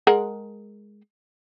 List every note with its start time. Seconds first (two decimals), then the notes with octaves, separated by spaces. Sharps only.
0.07 G#3 A#4 F#5